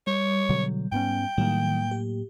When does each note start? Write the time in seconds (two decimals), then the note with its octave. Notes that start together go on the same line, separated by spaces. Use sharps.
0.07 G3 C#5
0.49 B2 D3 F#3
0.92 G#2 B3 C#4 G5
1.38 A2 D#3 F#3 G3 A#3
1.91 G4